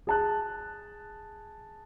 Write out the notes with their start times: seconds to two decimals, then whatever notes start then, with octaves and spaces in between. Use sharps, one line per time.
0.07 G#4 A5 F#6